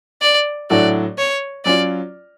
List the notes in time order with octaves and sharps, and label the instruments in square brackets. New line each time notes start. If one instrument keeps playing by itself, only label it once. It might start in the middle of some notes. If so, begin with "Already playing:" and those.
[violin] D5
[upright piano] A2 F#3 A3 D4 F#4 [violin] D5
[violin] C#5
[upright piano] F#3 C#4 F4 [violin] D5